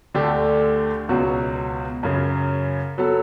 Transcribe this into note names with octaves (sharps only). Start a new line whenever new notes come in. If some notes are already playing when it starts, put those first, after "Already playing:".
D2 D3 A3 D4 G4
C#2 B2 F#3 B3 F#4
F#2 C#3 F#3
F#3 B3 F#4 A4